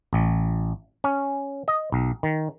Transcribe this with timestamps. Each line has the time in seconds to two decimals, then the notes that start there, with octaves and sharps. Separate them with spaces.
0.13 A1
1.04 C#4
1.68 D#5
1.92 B1
2.23 D#3